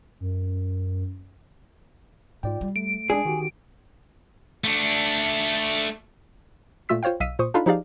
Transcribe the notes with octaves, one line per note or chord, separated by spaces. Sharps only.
F#2
G#2 F4 D5 G5
G3
A3 D7
G#3 C#4 D4 G#4 D5
D#3 F#4 G4
A3 D4
A#2 A3 F4 E6 B6
F4 C5 C#5 F5 G5
B1 D#5 F5 E6 B6 D#7
A#2 C5 C#6 D#6
D4 D#4 F4 A4 F5 B5
F3 D#4 G4 G#4 D5 F5